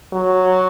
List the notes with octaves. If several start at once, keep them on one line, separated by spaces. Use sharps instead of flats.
F#3